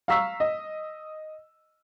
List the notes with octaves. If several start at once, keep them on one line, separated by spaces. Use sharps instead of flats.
F5 A#5 C#6 E6 B6
D#5